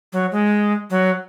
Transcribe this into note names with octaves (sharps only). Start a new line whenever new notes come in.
F#3
G#3
F#3